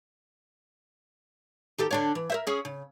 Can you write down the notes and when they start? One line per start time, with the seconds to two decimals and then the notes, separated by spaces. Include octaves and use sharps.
1.78 D#3 G4 A4
1.91 D3 D4 C#5
2.15 E3
2.30 A#4 C5 E5
2.47 C#4 G#4
2.65 C#3